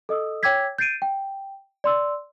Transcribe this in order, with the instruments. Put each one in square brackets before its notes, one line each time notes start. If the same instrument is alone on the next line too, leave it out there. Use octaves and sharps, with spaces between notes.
[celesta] A4 D#5 D#6 E6
C#5 G5 D6 E6 G#6 B6
G6 A6 C7 D7 D#7
G5
D5 C6 E6